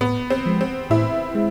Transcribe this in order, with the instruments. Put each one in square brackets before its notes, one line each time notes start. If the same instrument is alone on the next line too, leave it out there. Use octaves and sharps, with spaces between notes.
[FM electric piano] A2 [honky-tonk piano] B3
[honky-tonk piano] C4
[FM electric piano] F3 G#3
[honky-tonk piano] C4
[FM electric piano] A2 [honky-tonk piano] E4
[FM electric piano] G#3